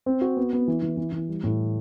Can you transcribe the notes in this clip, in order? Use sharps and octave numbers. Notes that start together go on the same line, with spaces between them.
C4
F#4
B3
B3
E3
E3
E3
E3
G3
A2